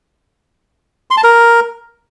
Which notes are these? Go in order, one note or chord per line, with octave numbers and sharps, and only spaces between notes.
C6
A5
A#4